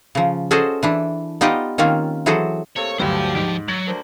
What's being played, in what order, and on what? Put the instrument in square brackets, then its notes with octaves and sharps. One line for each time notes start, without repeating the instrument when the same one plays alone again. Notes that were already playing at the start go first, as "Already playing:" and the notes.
[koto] C#3 F3
C#4 F#4 G#4 A4 C5 D#5
E3 D4 E4
B3 D#4 F4 G4 D5 D#5
D#3 A#3 C4 C#4 F4
E3 F#3 F#4 G#4 A4 C5
[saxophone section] C3 A3 A#3 [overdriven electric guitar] C#5
[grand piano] D2 G2 F#3 [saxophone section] D4 G4 [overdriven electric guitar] C5 F5
[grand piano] G#2 [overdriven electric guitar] F3
[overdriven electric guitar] F#3 [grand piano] G#6 A6 F#7
[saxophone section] D2 A#4 C5